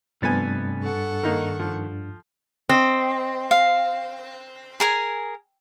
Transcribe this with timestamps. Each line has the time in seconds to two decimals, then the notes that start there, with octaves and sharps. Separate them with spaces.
0.22 G2 C3 F3 A3 B3 D4 G#5 A6
0.82 A4 F#5 C#6
1.23 D#3 A#3 D#4 A#4
1.60 F3
2.69 C4 D#5
3.51 F5
4.80 G#4 A#4 G#5